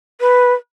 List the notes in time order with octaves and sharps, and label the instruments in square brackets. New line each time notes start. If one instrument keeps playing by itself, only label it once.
[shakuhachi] B4